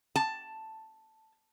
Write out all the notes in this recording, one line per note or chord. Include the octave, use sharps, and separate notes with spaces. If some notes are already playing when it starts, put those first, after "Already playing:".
A5